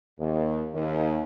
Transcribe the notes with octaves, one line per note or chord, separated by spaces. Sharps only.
D#2
D#2